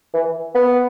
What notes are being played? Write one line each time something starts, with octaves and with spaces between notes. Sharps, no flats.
E3
B3